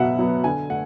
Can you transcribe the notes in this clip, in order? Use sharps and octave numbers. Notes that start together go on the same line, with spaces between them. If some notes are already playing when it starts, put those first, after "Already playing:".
Already playing: B2 F#3 B3 E5 F#5
F#3 B3
D3 G#5
A3 F#5